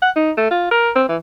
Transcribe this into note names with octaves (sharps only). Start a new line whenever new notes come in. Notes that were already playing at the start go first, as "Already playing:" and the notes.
F#5
D#4
A3
F4
A#4
C4
E3